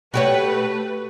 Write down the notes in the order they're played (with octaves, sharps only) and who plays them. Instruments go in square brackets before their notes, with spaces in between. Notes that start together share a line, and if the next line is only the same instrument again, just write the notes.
[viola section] A3 B4 [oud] F#4 G4 C#5